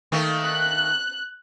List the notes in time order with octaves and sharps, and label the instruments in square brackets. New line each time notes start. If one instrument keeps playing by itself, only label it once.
[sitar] D#3 A3 A#3
[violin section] F#6